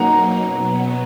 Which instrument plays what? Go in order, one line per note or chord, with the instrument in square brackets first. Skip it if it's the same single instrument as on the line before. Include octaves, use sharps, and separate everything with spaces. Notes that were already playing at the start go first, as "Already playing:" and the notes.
Already playing: [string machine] F#3 A#3 D#4 [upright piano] F#5 A#5
[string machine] B2 F#3 B3